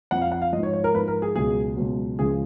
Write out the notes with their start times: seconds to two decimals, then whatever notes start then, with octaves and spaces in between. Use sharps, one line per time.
0.11 F2 F3 F#5
0.22 F5
0.32 F#5
0.42 F5
0.52 F3 D#5
0.56 G#2
0.63 C#5
0.74 C#5
0.84 A#4
0.94 G#2 F3 B4
1.08 A#4
1.22 G#4
1.35 C#2 B2 F#3 G#4
1.76 C#2 B2 F#3
2.19 C#2 C#3 F3 G#4